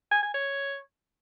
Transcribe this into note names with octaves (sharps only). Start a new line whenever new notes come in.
G#5
G#5
C#5